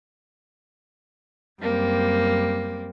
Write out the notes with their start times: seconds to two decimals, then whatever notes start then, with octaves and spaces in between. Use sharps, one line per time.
1.62 F#2 G3 A#3 C4